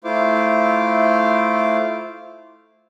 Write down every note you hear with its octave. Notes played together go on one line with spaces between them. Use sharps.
A3 E4 F4 C5 D6